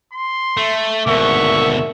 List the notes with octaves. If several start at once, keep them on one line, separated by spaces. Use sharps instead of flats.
C6
A3
G#1 D2 B2 A#4 E5 C#6